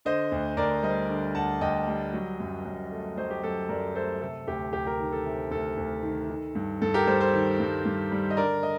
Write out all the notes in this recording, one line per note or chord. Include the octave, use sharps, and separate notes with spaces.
D3 C5 D#5
D2
D2 A#4 D5
G3 C5 D#5
D3
D2 F#5 A5
D2 D#5 G5
G3
F#3
F#2
F#2
A3
F#3 C5 D#5
G4
F#2 A4
F#2 A#4 D5
A3 A4 C5
C3 A4
D2 G4
D2 G4
G4 A#4
D#3
A4
C3
D2 A4
D2
D#3
D#3
G2
G2 A4
G4 A#4
G3 A4 C5
A4 C5
D#3
G2
G2
G3
D#5
D3 A#4 D5
D#5